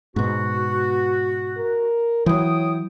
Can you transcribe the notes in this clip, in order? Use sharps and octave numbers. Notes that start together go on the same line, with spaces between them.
G#2 B2 B3 F#4
A#4
E3 F#3 E4 C#5 G5 D#6